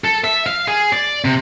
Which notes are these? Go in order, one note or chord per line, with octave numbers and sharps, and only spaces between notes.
A4
E5
F5
G#4
D5
C3